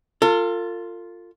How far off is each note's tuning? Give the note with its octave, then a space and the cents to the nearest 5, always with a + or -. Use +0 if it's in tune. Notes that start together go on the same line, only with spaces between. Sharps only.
F4 +0 A4 +40